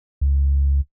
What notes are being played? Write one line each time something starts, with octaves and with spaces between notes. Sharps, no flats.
C#2